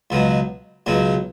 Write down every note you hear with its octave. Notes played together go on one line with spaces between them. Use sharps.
C#2 B2 F#3
C#2 B2 F#3